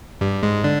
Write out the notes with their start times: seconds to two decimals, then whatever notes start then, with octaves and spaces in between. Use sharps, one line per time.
0.21 G2 G3
0.43 G#2 G#3
0.64 D3 D4